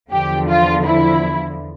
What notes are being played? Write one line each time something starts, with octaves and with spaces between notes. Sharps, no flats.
E2 D3 F3 G4
F4
E4